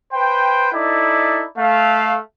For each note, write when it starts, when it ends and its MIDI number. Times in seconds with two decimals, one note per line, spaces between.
0.14 0.68 71
0.14 0.68 72
0.14 0.68 79
0.72 1.45 63
0.72 1.45 64
0.72 1.45 69
0.72 1.45 74
1.58 2.17 57
1.58 2.17 77